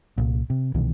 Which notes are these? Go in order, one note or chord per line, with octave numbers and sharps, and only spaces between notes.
C2 A#2
C3
C2 B2 D#3 E3